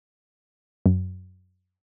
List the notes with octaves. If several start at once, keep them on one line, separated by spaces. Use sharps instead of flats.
F#2